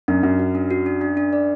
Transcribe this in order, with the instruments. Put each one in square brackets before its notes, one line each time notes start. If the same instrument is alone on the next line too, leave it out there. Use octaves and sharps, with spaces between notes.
[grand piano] F#2 [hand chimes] D4
[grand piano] F#2 [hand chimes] F#4
[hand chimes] F#4
D4
F#4
D4
D4
D4
D5